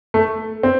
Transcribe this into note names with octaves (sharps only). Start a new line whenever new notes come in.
A3
C4